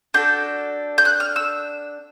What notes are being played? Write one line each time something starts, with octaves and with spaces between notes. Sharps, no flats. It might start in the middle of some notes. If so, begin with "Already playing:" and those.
D4 F#4 A4 G6
G6
F#6
F6
E6